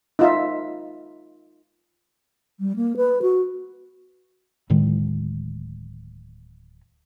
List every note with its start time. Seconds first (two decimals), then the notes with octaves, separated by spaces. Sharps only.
0.19 D#4 F4 E5
2.60 G3
2.76 A#3
2.97 B4
3.22 F#4
4.70 D1 A2 D#3 G#3